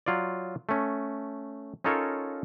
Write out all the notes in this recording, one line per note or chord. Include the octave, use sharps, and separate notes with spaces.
F#3 F4 C#5 D5
A3 C#4
C#4 D#4 F4 A4 A#4 C#5